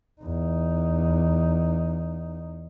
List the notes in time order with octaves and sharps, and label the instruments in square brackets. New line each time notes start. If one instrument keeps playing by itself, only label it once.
[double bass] E2 D#4